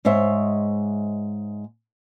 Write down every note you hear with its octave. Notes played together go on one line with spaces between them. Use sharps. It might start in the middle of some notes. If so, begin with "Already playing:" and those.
G#2 G#3 C5 C#5 E5